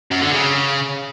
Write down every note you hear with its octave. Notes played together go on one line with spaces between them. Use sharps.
F#2
D3
C#3